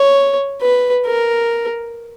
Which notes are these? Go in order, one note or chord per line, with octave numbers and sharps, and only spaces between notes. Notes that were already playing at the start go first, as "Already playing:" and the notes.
Already playing: C#5
B4
A#4